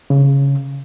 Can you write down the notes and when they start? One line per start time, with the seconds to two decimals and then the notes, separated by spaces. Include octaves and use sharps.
0.10 C#3